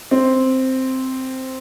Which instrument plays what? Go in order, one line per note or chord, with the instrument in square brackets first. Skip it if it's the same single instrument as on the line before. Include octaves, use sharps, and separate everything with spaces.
[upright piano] C4